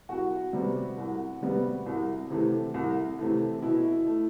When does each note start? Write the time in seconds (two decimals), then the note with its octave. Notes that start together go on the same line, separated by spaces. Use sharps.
0.09 C2 F#4
0.53 C3 G3 B3
0.98 C2
1.41 C3 G3 B3
1.86 C2
2.30 C3 E3 A3
2.74 C2
3.19 C3 E3 A3
3.62 B2 E4
4.07 A3